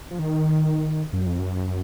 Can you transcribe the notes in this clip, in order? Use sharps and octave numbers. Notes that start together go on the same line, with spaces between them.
F3
D#3
F#2
F2
F#2